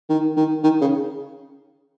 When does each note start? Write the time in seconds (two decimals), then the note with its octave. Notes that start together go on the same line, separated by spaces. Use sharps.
0.10 D#3
0.36 D#3
0.64 D#3
0.81 C#3